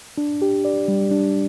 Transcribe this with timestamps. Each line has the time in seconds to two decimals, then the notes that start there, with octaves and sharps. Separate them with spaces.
0.18 D4
0.42 G4
0.65 D5
0.88 G3
1.11 D4